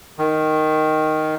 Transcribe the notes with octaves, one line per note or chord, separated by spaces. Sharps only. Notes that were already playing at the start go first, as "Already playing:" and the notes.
D#3